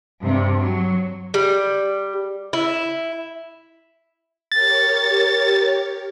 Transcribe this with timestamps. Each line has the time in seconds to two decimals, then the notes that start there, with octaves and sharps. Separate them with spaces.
0.22 G2 C3
0.57 F#3
1.34 G3
2.53 E4
4.52 G4 A#4 C#5 A6